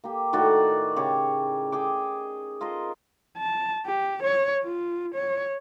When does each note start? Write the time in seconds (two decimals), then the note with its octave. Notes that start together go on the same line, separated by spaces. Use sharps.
0.04 A#3 G4
0.33 A2 D#3 F#4 D5
0.96 C#3 G4 C#5
1.72 G#4 G5 D6
2.61 F4 A#4 C5 D#5
3.38 A5
3.86 G4
4.23 C#5
4.64 F4
5.15 C#5